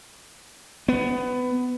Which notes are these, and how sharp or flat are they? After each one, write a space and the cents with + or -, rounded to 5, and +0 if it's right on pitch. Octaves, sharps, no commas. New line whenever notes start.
B3 +20